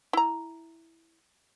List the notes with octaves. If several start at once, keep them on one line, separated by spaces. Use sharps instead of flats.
E4 A#5